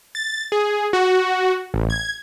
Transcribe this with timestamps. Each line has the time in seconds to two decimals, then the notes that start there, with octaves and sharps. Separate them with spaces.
0.15 A6
0.52 G#4
0.93 F#4
1.74 A1
1.90 G#6